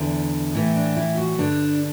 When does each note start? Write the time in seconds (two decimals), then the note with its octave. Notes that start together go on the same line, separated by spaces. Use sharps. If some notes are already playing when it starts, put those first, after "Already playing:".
Already playing: E2 D3 E4
0.55 A2 E3 E4
0.76 D4
0.97 E4
1.17 F#4
1.38 G2 D3 D4